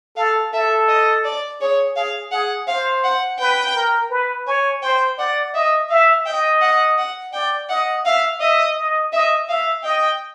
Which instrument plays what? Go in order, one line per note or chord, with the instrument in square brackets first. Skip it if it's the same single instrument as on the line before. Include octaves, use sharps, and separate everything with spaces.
[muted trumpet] A4 [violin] F5
[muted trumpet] A4 [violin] E5
[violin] D#5
D5
[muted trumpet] G#4 [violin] C#5
[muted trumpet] G#4 [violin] F5
[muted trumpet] G#4 [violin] F#5
[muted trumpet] C5 [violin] F5
[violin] F#5
[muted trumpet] B4 [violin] G5
[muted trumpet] A#4
B4
[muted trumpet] C#5 [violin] G#5
[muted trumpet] C5 [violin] G5
[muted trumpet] D5 [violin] F#5
[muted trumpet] D#5 [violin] E5
[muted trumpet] E5 [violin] F5
[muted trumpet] D#5 [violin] G5
[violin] F#5
F#5
[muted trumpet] D5 [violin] G5
[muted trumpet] D#5 [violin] F#5
[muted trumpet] E5 [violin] F5
[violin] D#5 [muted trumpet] E5
[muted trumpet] D#5
[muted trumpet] D#5 [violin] E5
[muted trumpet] E5 [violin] F5
[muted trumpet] D#5 [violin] G5